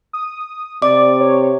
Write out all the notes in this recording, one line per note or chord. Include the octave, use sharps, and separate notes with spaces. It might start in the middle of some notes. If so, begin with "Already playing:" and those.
D#6
C3 D5 D6
C#5